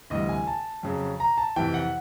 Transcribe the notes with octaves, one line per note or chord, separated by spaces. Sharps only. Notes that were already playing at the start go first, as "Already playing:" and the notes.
D2 C3 E3 G3 D#5
G#5
A5
F2 C#3 F#3
A#5
A5
F2 C3 E3 G5
F#5